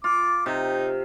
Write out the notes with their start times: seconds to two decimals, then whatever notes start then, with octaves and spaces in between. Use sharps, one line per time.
0.04 F4 D6
0.46 C3 D#4